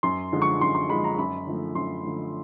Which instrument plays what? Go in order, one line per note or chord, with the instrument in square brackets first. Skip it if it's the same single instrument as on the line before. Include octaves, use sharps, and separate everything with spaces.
[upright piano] F#2 C6
D3 F3 G#3
C#6
F#2 C6
C6
D3 F3 G#3 B5
A#5
F#2 B5
D3 F3 A3
F#2 C6
D3 F3 A3